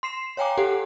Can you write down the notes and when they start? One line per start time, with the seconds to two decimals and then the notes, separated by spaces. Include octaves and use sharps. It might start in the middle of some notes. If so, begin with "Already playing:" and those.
0.03 C6 C7 E7
0.37 C#5 F5 G5 G#5 A#5 D6
0.58 G4 A4 F#5